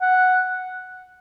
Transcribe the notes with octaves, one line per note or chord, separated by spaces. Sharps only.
F#5